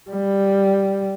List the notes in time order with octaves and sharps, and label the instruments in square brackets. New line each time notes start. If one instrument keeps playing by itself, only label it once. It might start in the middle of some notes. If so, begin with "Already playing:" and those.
[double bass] G3